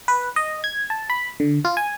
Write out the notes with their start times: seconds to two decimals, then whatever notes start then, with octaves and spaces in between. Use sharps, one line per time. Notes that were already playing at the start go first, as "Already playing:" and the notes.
0.08 B4
0.36 D#5
0.64 G#6
0.90 A5
1.10 B5
1.40 D3
1.65 F4
1.77 G#5